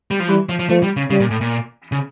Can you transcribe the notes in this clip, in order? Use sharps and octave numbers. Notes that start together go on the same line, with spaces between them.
G3
F3
E3 G3
F3
F3
F3 A3
G3
C#3
C#3 G3
A#2
A2
A#2
C#3